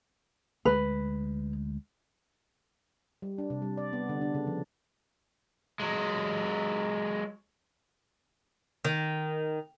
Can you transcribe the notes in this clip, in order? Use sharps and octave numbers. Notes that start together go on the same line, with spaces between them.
D2 G#3 B4
G3
D4
C3
G3
D5
B3
D3
D4
C#3
F3
F#3 G#3
D#3